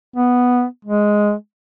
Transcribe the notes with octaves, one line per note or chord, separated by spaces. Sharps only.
B3
G#3